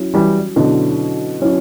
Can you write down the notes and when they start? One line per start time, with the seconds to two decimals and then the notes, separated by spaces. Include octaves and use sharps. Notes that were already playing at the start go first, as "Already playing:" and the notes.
Already playing: F#3 C#4 E4
0.14 E3 G3
0.56 B2 D3 F#3 C#4 E4
1.41 F#3 C#4 E4